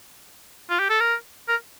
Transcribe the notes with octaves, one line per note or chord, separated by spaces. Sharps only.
F4
G4
A4
A#4
A#4